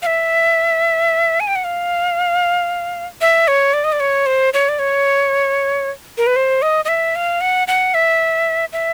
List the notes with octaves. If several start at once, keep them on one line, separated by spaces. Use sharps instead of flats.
F5
E5
G#5
G5
F#5
F5
E5
C#5
D5
D#5
D5
C#5
C5
C#5
D5
C#5
A#4
B4
C5
D#5
D#5
E5
F5
F#5
F#5
E5
E5